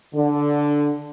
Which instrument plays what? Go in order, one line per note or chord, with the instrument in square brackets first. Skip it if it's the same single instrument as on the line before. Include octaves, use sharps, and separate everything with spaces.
[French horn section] D3